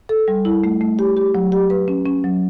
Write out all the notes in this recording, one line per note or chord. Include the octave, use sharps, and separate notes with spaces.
A4
G3
E4
A3
A3
G4
G4
F#3
G4
B4
C#4
C#4
F#3